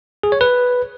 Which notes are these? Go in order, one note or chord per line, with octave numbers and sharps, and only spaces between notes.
G#4
C#5
B4